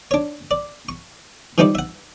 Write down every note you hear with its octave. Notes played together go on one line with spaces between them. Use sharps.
D4 C#5
D5
C#6
E3 F3 G3 D#4 E4 D5
E5 F#5